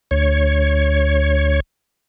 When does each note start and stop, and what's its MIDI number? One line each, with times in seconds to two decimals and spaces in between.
0.11 1.60 38
0.11 1.60 73